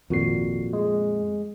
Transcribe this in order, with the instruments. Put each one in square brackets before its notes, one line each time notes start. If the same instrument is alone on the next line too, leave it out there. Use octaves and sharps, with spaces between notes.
[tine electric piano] G#1 F#4 C7 [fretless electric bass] F2 A#2
[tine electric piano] G#3